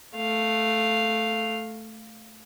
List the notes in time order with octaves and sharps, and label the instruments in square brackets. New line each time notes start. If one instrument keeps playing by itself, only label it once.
[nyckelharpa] A3 F5